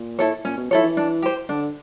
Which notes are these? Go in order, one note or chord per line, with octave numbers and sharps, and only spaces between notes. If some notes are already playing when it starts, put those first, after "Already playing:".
Already playing: A#2
E4 A4 C#5
A#2 C#4
B2
F3 E4 A4 C#5
E3
D4
G4 C5
D3 D4